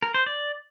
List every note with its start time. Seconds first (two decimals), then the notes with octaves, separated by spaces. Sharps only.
0.02 A#4
0.14 C5
0.26 D5